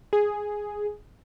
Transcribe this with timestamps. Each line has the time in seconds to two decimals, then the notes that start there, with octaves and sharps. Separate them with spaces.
0.13 G#4